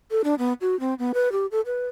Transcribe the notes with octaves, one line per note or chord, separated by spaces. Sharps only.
A4
D4
B3
F#4
C4
B3
B4
G4
A4
B4